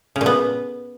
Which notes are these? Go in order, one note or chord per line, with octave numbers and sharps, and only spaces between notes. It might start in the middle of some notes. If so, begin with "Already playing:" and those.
C#3
A#2
B3